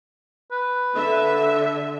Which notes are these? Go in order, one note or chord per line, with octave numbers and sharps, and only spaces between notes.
B4
D3 E5